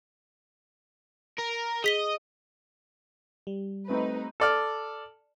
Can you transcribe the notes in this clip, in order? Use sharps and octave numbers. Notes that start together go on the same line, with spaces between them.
A#4
G#4 D#5 B6 G7
G3
A3 C4 D#4 B4
A4 D5 F6